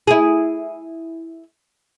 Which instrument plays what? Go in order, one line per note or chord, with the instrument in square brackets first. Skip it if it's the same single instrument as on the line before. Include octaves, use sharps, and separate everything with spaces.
[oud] E4 G#4